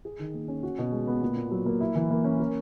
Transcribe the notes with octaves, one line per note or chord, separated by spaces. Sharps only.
G#4
D#3
A#3
C#4
F#4
B2
G#3
B3
A#2
A#2
F#3
A#3
E4
E3
A#3
C#4
A#4